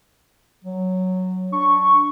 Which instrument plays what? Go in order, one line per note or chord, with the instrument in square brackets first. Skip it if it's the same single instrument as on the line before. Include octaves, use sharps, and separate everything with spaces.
[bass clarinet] F#3
[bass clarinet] D4 [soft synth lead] C#6